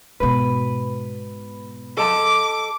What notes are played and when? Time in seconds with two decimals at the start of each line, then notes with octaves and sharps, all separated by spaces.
0.20 G#2 B2 B4
1.97 A4 D#5 A5 D6